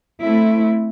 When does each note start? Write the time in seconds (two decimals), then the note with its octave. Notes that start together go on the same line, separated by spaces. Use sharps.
0.21 A3 C4 E4